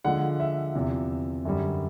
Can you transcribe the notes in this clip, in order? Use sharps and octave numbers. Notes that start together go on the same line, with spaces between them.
D3 F3 G#3 F#5
E5
E2 C3 F3
F#2 D3 G3